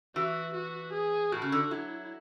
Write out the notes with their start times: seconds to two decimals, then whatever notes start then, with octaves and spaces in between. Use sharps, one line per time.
0.16 E3 F#4
0.54 F#4
0.93 G#4
1.32 A2 F#4
1.42 C#3
1.52 D3
1.71 F#3 E4